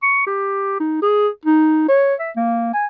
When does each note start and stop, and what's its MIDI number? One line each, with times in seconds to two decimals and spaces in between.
0.03 0.24 85
0.27 0.78 67
0.80 1.02 63
1.02 1.29 68
1.45 1.87 63
1.89 2.15 73
2.20 2.31 76
2.36 2.72 58
2.74 2.86 80